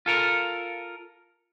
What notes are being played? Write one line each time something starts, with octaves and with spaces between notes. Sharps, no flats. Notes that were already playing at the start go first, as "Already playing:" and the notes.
F4 A4 A#4